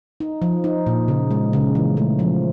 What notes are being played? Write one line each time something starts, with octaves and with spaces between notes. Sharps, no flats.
D#4
F3
D#4
A#2
C#3
G#3
C#3
E3
A3
F3